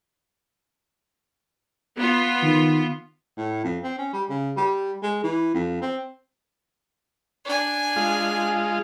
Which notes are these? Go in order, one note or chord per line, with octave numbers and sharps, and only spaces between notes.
B3 F4
D#3
A2
F2
C4
C#4
G3
C#3
G3
G#3
E3
F2
C4
D4 G#5
G#3 F4